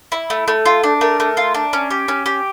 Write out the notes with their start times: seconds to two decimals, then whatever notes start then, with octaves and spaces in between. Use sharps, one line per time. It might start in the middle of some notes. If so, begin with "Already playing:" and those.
0.12 E4
0.30 A3
0.48 A3
0.65 F4
0.84 D4
1.01 A3 A#4
1.20 A3
1.37 F4
1.55 D4
1.73 C#4
1.91 G4
2.08 C#4
2.26 G4